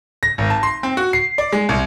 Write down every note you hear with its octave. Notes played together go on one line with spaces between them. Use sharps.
A#6
G#1
A5
C6
C4
F#4
C7
D5
G#3
C2